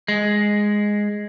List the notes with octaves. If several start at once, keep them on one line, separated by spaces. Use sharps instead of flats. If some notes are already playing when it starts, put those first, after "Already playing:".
G#3